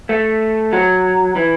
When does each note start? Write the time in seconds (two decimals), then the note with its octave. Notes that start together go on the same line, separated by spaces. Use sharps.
0.09 A3
0.73 F#3
1.36 E3